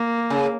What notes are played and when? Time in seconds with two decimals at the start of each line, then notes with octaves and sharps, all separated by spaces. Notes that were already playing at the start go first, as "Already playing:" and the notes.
Already playing: A#3
0.30 C#3